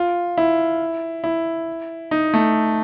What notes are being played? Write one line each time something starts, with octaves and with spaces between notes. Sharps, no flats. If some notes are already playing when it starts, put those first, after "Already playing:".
Already playing: F4
E4
E4
D#4
A3